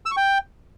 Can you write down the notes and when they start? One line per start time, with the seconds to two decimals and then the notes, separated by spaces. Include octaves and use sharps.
0.06 E6
0.11 C#6
0.17 G5